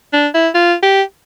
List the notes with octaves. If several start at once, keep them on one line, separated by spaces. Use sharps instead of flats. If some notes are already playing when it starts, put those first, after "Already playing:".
D4
E4
F4
G4